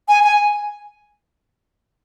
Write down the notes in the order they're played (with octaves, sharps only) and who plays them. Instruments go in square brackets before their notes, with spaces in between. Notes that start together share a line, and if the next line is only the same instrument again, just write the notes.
[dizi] G#5
G#5